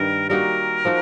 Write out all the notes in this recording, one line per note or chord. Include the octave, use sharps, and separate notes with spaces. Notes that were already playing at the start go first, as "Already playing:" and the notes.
Already playing: G2 D#3 G3 A#4
G3 A#3 D#4 F#4 A#4
F3 A#3 D#4 F#4